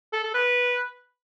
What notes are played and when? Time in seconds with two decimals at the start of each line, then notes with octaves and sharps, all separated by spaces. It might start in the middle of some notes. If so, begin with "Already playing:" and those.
0.13 A4
0.24 A4
0.34 B4